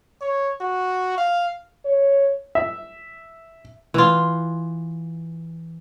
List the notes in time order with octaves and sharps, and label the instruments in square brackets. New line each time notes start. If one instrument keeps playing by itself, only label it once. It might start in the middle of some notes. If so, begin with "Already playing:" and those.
[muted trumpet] C#5
F#4
F5
[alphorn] C#5
[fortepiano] E5
[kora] E3 F4